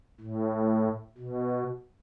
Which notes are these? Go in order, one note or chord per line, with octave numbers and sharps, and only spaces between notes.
A2
B2